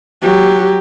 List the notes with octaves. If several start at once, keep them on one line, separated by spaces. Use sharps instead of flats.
F#3 G4